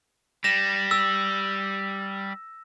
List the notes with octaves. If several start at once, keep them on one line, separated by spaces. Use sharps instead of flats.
G3 A#6 E7
E6